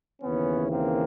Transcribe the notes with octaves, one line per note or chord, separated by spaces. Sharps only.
D#2 C#3 E3 B3 C#4
A#3 C4